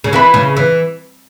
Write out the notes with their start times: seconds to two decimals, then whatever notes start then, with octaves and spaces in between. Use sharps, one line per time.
0.04 C#3
0.13 E3 B4 E5 B5
0.34 C#3
0.57 E3